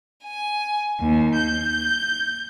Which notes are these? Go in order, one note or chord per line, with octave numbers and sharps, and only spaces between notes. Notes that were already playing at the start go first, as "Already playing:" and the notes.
G#5
D#2
G6